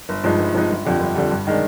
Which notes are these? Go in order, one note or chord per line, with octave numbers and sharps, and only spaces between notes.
G1
G2 F3 G#3 D#4
G1
G2 F3 G#3 D#4
G1
F2 D3 G3
G1
F2 D3 G3
G2
D#3 G#3 D4